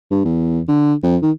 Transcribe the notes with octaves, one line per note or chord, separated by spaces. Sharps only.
G2
E2
D3
F2
D#3